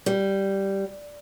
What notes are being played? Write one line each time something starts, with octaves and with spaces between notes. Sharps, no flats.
G3